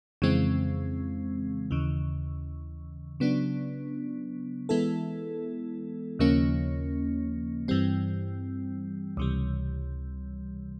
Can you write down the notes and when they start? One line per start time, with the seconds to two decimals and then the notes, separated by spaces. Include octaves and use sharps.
0.22 F2 C#3 E3 G#3 C4
1.71 D#2 C#3 E3
3.20 C#3 F#3 B3 D4
4.69 E3 G#3 B3 E4 A4
6.19 D#2 C#3 F3 A#3 C#4
7.68 G2 E3 G3 C4
9.17 C#2 C3 E3 G3